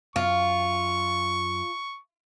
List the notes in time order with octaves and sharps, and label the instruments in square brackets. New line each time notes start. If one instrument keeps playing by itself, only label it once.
[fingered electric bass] F#2 [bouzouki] F4 [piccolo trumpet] C#6